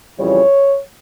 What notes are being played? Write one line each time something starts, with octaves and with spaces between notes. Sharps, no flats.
F2 C#3 E3 G3 C#5